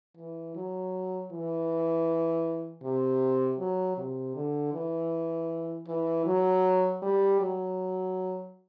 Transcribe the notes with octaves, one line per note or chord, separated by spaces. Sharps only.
E3
F#3
E3
C3
F#3
C3
D3
E3
E3
F#3
G3
F#3